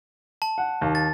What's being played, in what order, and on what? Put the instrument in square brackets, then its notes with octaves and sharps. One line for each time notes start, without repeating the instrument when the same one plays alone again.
[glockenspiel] A5
[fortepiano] F#5
D#2
[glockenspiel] A6